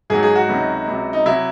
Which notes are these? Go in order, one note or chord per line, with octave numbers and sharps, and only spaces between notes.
G#2 D#3 F#3 G#4
G#4
F#4
C#2 C3 D#3 F#3
C#2 C3 F#3
D#4
C3 F#3 E4